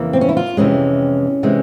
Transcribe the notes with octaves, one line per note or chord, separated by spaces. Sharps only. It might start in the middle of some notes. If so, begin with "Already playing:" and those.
Already playing: F2 C#3 E3 A#3
C4
C#4
E4
F4
F2 C3 E3 G#3 C#4
C3 E3 G#3